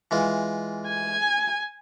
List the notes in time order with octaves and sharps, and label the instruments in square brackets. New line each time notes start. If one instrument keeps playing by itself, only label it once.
[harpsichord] E3 G#3 F4
[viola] G#5